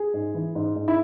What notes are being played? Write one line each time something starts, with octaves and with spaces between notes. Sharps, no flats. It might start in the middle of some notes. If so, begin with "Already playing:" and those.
Already playing: G#4
G#2
E3
G#2
G#2
E4